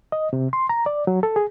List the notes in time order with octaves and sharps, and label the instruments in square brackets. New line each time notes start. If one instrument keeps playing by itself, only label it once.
[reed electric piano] D#5
C3
C6
A#5
D5
F#3
A4
G#4